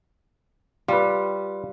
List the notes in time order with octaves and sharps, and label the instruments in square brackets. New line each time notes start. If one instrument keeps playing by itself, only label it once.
[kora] G3 [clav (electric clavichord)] F4 B4